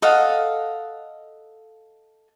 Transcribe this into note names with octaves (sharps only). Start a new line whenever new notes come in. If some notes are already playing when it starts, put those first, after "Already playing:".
A4 D#5 F5 F#5